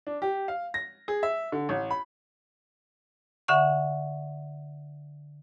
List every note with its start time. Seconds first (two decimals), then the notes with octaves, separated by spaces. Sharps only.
0.07 D4
0.22 G4
0.48 F5
0.74 A#6
1.08 G#4
1.23 E5
1.52 D3
1.69 A1
1.91 B5
3.48 D3 E5 F#5 C#6